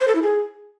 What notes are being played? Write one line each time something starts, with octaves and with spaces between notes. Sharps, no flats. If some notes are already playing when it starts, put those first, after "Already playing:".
C5
A4
E4
G#4